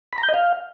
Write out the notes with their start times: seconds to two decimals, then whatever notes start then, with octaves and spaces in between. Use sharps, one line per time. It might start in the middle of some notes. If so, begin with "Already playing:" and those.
0.13 B5
0.18 A#5
0.23 G6
0.29 D#5
0.34 F5